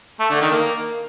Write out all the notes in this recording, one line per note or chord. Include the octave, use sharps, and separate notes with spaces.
A3
D3
D#3
A#3